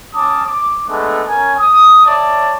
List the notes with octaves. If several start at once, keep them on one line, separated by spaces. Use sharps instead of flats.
C#4 A5 D6 D#6
D6
G#3 A3 B3 D4
C#4 A#4 G#5
D#6
C#5 D5 E5 A5